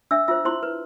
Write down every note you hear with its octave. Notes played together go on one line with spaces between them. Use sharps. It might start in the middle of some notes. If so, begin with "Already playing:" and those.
D4 E5 E6
F4 C5 E5 E6
E4 C5 C6
B4